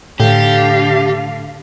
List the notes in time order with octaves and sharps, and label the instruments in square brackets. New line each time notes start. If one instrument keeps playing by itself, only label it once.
[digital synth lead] A2 [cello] D3 F5 [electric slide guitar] G4